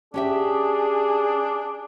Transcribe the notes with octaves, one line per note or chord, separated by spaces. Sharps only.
C#4 D4 G4 G#4 E5